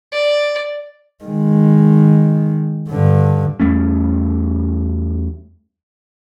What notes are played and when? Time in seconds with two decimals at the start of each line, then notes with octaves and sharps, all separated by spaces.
0.12 D5
1.24 D#3 G#3
2.89 G2 D3
3.60 E2 G3 A3 C#4